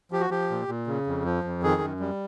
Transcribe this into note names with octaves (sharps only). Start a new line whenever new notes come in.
F3 G4
F#4
F3 G4
A#2
A#2
C#3
F2
F3
F2
D#3 G#4
F#2
G3